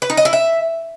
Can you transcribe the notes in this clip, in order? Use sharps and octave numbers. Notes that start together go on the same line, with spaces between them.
B4
D#4
D#5
E4
E5